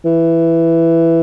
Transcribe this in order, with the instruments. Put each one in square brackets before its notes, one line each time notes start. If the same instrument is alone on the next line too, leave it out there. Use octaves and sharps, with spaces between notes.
[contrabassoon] E3